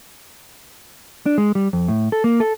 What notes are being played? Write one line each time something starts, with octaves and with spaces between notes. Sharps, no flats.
D4
G#3
G3
F2
A2
A4
A#3
A4